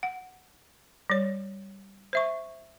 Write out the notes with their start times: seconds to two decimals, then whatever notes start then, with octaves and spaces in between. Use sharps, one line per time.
0.03 F#5
1.10 G3 C#5
2.13 C5 E5 C#6